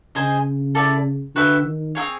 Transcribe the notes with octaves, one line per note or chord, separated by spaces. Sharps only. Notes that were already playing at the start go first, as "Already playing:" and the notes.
C#3 G#4 C5 D#5 G#5
E4 A4 D5
D3 F#4 B4 E5 G5
D#3
C4 E4 G#4 C#5